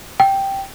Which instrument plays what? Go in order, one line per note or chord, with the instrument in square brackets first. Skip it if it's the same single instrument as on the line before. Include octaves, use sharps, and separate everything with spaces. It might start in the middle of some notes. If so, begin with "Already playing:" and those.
[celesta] G5